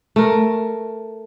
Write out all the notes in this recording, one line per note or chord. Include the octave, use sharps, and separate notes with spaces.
A3 A#4